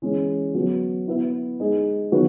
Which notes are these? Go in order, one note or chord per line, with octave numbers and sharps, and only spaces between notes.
E3 G#3 C#4
F#3 B3 F#4
B3 E4 B4 E5
G#3 D#4 G#4 D#5
D#3 F#3 B3 F#4 B4